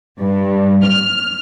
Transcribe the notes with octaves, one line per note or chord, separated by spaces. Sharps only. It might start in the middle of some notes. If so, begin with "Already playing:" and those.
G2
F6